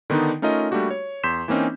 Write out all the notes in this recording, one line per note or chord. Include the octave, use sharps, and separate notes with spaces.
D3 D#3 B3 D4 D#4
A3 C#4 D#4 F4 A#4 D#5
G3 A3 A#3 D4 F#4 G4
C#5
E2 C6 G6 B6 E7
E3 A#3 C4 C#4 D#4